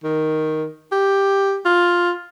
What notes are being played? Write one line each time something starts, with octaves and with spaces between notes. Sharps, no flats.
D#3
G4
F4